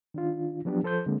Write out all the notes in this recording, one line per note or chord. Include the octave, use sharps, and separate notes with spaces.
D#3 D4 F4
F3 F#3 B3 D4 G4
F3 A4 C5 C6 G6
D3 G#3 A#3 C4